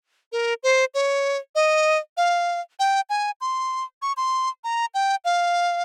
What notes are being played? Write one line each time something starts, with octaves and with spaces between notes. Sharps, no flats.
A#4
C5
C#5
D#5
F5
G5
G#5
C6
C#6
C6
A#5
G5
F5